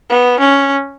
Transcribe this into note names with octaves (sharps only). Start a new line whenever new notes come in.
B3
C#4